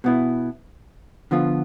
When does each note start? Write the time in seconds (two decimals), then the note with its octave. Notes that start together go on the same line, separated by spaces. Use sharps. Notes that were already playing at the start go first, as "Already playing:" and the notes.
0.04 B2 B3 E4
1.31 D3 F3 B3 F4